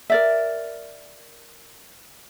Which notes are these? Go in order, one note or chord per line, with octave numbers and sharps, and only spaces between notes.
A#4 D5 E5